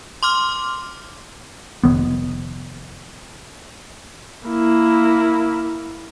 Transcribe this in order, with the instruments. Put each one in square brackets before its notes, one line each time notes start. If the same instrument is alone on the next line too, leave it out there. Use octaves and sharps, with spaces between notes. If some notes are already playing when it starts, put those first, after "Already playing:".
[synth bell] C6 D6 F6
[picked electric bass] F1 D#2 D#3 B3
[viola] A#3 E4